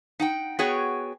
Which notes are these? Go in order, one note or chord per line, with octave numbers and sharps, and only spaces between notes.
D#4 F#5 G5
B3 F#4 G#4 C#5 G5